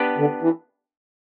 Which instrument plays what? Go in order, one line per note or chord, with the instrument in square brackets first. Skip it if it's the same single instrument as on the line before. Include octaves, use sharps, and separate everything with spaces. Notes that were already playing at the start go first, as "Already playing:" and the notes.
Already playing: [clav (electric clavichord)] B3 D4 G4 B4
[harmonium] D3
E3